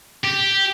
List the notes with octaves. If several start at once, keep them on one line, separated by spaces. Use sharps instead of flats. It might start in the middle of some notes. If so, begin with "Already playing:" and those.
G4